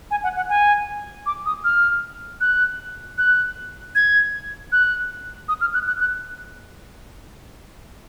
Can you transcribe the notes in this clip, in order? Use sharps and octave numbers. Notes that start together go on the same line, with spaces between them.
G#5
F#5
F#5
G#5
D6
D#6
F6
F#6
F#6
G#6
F#6
D#6
F6
F#6
F#6
F#6